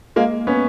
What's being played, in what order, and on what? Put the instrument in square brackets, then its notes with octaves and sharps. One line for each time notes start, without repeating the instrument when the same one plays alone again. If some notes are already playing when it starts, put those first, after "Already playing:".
[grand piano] G#3 A#3
B3 C#4